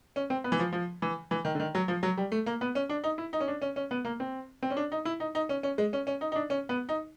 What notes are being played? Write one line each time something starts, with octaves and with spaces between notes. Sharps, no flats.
C#4
C4
B3
E3
F3
F3
E3
E3
D#3
D3
D#3
F#3
F3
F#3
G3
A3
A#3
B3
C#4
D4
D#4
E4
D#4
C#4
D4
C#4
C#4
B3
A#3
C4
C4
C#4
D4
D#4
E4
D#4
D#4
C#4
C#4
G#3
C#4
C#4
D#4
D#4
D4
C#4
B3
D#4